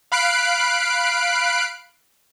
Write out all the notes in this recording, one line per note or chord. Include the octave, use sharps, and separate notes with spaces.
F5 B5 F#6 C7 D7